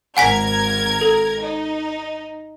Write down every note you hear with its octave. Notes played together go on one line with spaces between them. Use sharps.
G#1 A#4 F#5 G#5 G#6 B6
A4
D#4